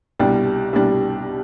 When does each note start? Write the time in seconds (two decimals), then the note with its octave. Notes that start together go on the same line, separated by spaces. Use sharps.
0.20 C2 B2 G3 D4 G4
0.73 C2 B2 G3 D4 G4